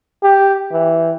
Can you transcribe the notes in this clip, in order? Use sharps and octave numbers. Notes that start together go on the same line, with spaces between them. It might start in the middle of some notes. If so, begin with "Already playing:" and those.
G4
E3